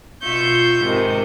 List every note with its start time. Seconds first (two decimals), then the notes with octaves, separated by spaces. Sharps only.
0.23 B2 F4 E5 C#6 G6
0.85 G#2 C3 D#3 G#3